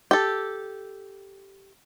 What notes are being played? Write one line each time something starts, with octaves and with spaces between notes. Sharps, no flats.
G4 A4